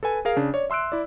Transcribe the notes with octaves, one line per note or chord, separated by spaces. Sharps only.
A4 B4 G#5
G#4 A#4 F5
C#3 D4
C#5 D5
E5 C6 E6 F#6 D7
E4 D5